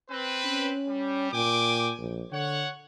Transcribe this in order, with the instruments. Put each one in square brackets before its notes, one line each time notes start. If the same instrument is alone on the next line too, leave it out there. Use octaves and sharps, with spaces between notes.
[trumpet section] C4 B4
[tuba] C#4
[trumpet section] G3
[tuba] A#2 [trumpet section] G5 G#5 D6
[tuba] A#1
[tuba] D3 [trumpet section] C#5 F#5